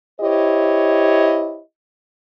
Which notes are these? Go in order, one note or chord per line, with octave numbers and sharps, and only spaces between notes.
E4 G4 C5 C#5 D#5